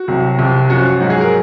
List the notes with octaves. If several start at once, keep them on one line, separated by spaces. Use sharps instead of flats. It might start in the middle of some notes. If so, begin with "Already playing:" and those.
Already playing: F#4
C2 C3 F#3
C2 C3 F3
F#2 F3 F#4
G#2 F#3
G#4
A#4